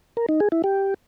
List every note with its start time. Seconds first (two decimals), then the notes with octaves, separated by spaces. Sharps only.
0.17 A#4
0.29 D#4
0.40 G#4
0.52 E4
0.64 G4